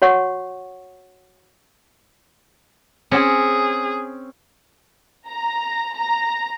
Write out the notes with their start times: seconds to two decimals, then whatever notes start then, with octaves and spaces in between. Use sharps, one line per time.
0.02 F#4 C#5 F#5 C#6
3.11 C4 C#4 G#4
5.28 A#5
5.96 A#5